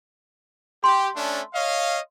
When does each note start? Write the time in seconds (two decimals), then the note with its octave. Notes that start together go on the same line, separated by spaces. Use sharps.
0.84 G4 C6
1.16 A3 C#4 D4
1.54 C#5 D#5 F5